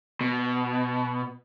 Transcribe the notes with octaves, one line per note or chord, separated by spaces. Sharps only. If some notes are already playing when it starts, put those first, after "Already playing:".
B2